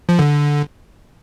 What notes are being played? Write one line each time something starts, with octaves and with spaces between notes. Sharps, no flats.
F3
D3